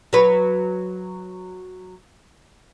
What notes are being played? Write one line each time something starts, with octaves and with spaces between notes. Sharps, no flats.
F#3 B4